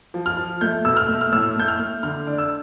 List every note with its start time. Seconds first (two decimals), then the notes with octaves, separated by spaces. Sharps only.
0.14 F3
0.26 F6
0.37 F3
0.61 A3 G6
0.85 B2 E6
0.97 F6
1.09 A3
1.21 F6
1.32 A2 E6
1.56 A3 G6
1.68 F6
1.79 A3
2.03 D3 F6
2.27 D4
2.38 E6